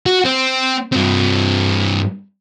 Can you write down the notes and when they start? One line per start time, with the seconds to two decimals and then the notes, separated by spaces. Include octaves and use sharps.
0.06 F#4
0.25 C4
0.92 G2 C4